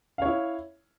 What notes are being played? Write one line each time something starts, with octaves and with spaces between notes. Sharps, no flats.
E4 C#5 F5